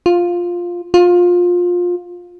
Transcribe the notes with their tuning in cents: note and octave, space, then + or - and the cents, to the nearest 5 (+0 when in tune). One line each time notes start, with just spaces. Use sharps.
F4 +5
F4 +20